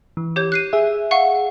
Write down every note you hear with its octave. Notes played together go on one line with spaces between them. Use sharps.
E3
G4 C#5 G6
F#6 C7 D#7
G#4 E5
F5 F#5 C#6